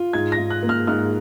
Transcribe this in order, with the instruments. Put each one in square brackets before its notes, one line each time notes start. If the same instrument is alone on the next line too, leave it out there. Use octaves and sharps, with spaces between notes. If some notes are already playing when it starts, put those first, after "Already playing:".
Already playing: [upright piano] F4
G#2 G#6
A#6
G#2
F#6
A#3
F6
G#2 F6